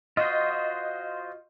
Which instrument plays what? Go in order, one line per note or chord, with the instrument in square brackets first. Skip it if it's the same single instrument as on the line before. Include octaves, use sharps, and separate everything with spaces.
[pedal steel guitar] F4 F#4 C5 [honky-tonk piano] D#5